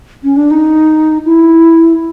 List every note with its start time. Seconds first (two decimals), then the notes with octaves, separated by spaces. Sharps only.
0.23 C#4
0.36 D4
0.50 D#4
1.25 E4